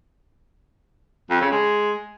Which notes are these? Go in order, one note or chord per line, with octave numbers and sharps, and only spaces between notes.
F2
C#3
G#3